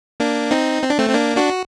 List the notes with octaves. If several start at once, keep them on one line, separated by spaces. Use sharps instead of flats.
A#3 D4
C4 D#4
C4
D4
A3 C4
C4
A#3 D4
D4 F#4